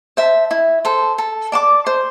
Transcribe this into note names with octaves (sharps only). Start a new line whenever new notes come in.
C5 E5 A5
E4
A4 C5
A4
D5 A5 D6
C5